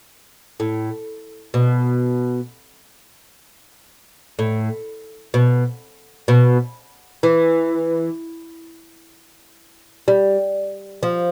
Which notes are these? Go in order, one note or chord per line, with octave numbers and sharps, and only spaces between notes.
A2
B2
A2
B2
B2
E3
G3
F3